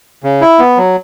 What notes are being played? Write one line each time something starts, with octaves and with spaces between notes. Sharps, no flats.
C#3
E4
B3
F#3